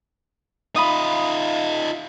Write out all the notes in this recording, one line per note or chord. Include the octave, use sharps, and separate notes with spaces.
D#4 F4 B5 D#6